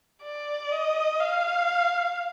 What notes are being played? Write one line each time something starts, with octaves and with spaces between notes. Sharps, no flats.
D5
D#5
F5